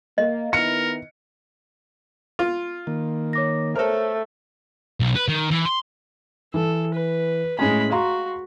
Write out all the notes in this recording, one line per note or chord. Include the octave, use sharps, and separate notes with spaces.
A#3 D#5
D#3 B3 E4 A#4 C#7
F4
D#3 A#3
C#5 D6 A#6
A3 A4 A#4 C5 C#5
B1
B4
D#3
E3
C6
E3 A4
B4
A2 G#3 C#4 G#5 B5
F#4 F5 A#5 C6